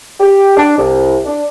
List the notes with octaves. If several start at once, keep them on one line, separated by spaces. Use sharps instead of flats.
G4
D4
C2
D4